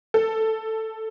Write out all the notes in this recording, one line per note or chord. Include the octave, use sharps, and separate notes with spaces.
A4